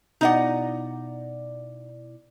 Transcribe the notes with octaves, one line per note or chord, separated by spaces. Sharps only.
B2 D#4 E4 D5 D#5 F#5